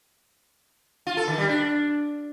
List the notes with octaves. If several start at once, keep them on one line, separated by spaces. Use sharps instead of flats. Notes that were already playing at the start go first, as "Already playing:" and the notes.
F4
A4
D#3
G3
D4